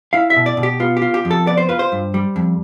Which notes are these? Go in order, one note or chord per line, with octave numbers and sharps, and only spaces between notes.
E4 F5
E5
B2
D5
B2
G4
B3 F4
G4
F4
G4
F2
A4
B3 D5
C5
F4 B4
C5
G2
G3
F2